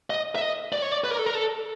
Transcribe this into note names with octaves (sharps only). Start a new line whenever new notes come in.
D#5
E5
D#5
D5
C#5
D5
B4
A#4
A4
A#4
A4